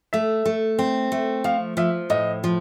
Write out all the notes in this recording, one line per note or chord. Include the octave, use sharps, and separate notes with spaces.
A3 E5
A3
C4
A3
F3 F5
F3 E5
A2 D#5
F3